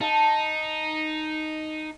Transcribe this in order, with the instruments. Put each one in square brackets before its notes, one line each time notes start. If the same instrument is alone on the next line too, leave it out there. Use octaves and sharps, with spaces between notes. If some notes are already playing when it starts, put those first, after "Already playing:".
[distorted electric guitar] D#4 [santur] A5